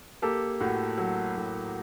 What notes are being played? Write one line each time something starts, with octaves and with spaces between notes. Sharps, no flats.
A#3 G4 A4
A2 F#4
F#3
A2